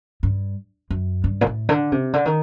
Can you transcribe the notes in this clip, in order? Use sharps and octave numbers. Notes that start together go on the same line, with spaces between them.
G2
F#2
G2
A#2
A2
D3
C3
D3
D#3